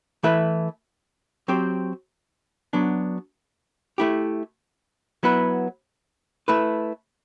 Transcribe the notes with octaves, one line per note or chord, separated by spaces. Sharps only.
E3 A3 E4 B4 E5
F#3 C4 G4 C5
F#3 B3 D4
A3 E4 G4
F#3 B3 E4 B4
A3 E4 B4